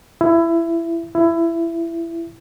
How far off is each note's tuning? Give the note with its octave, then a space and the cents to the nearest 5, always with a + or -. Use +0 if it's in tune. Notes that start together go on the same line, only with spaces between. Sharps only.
E4 +20
E4 +20